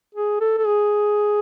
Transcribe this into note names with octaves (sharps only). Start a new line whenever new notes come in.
G#4
A4
A4
G#4